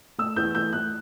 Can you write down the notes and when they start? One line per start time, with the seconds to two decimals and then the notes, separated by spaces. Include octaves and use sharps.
0.18 A3 E6
0.36 E2 G6
0.55 A3 G6
0.73 A3 F#6